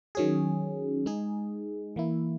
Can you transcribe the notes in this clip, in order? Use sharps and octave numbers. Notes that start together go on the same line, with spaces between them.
D#3 F#3 C#4 G#4
G#3 D#4 G#4
E3 A#3 E4